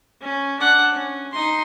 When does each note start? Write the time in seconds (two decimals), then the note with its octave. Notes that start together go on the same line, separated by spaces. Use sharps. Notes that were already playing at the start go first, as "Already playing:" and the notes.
0.21 C#4
0.59 D4 F#5
0.93 C#4
1.32 D#4 C6